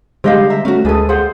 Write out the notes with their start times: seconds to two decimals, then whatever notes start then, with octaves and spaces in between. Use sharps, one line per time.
0.24 D3 G3 G#3 G4 C5 D#5 F5
0.50 E5 A#5
0.65 A3 C#4 F#4
0.85 D2 G#3 G#4 A4 B4 G#5
1.09 G#4 C5 F#5